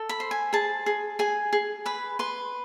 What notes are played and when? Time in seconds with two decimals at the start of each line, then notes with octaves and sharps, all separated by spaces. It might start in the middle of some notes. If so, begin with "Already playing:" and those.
Already playing: A4
0.09 B5
0.20 C5
0.31 G#5
0.53 G#4 A5
0.86 G#4
1.19 G#4 G#5
1.53 G#4
1.86 B4 B5
2.19 B4 C6